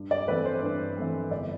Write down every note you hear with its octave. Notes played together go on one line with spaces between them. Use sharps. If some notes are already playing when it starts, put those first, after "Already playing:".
Already playing: G2
D5
E3 A3 C4 B4
C5
G2
E3 A3 C4
G1 D5